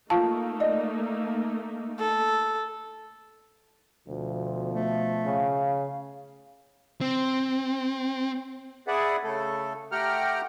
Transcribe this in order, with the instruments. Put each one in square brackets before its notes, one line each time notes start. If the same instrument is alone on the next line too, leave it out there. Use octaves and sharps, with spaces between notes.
[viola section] A3 A#3 D#4 [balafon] F4 F5 A5
[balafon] D5 D#5
[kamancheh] A4
[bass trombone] D2 [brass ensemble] B2 F3
[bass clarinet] A3
[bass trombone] C#3 [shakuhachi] F5
[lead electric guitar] C4
[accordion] G#4 B4 D5 E5 F#5
C#3 A3 A4
A3 G4 F#5 G5 A#5 F6